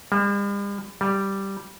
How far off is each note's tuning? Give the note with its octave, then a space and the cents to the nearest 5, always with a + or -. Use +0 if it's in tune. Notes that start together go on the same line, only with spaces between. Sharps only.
G3 +45
G3 -5